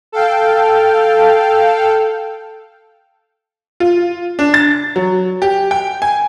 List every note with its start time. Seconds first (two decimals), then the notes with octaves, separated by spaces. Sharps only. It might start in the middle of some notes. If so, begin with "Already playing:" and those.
0.12 A4 F5 G5
3.80 F4
4.39 D4
4.54 A6
4.96 F#3
5.42 G4
5.71 G5
6.02 G#5